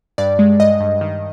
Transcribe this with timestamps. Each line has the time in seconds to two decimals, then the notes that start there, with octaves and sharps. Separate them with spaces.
0.18 G2 D5
0.39 G#3
0.60 G2 D#5
0.80 G2
1.01 D#3